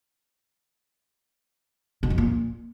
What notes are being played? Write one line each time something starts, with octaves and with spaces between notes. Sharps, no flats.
B2
F2
A#2